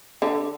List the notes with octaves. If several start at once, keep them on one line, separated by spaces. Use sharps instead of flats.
D3